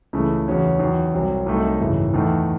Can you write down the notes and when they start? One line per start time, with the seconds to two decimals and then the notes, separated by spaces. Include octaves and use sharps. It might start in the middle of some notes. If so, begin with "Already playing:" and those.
0.13 C#2 C#3 E3 A3
0.47 E2 C#3 F#3 C#4 F#4
0.79 E2 D#3 F#3
1.14 C2 C3 F#3
1.46 C2 C3 F#3 A3 D#4
1.80 G#1 F#2 C#3 E3
2.13 E2 D#3 A3 D#4